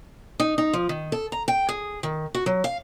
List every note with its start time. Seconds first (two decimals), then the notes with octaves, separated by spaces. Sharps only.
0.40 D#4
0.58 D#4
0.73 F3
0.89 D#3
1.12 A4
1.32 A#5
1.48 G5
1.69 G#4
2.03 D#3
2.35 F#4
2.46 F#3
2.64 F5